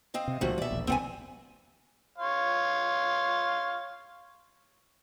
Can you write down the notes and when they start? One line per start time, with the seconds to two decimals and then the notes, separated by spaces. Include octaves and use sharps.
0.14 C4 D#5 F5
0.28 C3
0.41 C2 A#2 D#3 F3 A3 F#4
0.58 B2 F#3 D5 E5
0.71 E1 A#1
0.87 D#1 C2 B3 C4 F#5 G#5
2.18 C#5 F5 C6